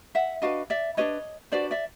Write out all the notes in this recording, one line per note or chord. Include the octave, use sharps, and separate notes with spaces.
E5 F#5
D4 F#4 B4 D#5 F5
D5 E5
D4 F#4 B4 C#5 D#5
D4 F#4 B4 C5 D5
D5 E5